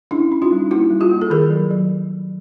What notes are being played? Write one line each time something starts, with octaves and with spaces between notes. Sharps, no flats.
C#4 D4 E4
C#4
D#4 F4
G3
A#3 E4 F#4
G3
F4 G4
A#3
A4
D#3 G#4 A#4
F#3
F#3